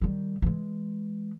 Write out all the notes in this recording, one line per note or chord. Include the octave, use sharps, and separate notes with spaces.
D#3 G3
E3 G#3